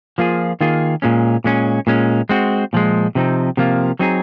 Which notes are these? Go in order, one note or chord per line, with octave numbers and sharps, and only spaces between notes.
F3 A#3 F4 G#4
D#3 A#3 F4 G#4
A#2 G#3 C#4
A#2 G#3 C#4
A#2 G#3 C#4
G#3 C4 F#4
A#2 F3 G#3
C3 F3 C4 D#4
C3 F3 A#3 F4
F#3 C4 D#4 G#4